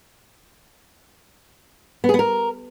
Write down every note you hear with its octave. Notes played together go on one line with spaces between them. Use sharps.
B3
G#4
B3
A#4